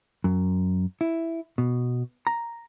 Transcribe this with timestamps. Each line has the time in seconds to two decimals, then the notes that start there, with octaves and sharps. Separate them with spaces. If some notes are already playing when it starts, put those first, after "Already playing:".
0.24 F#2
1.01 E4
1.58 B2
2.27 A#5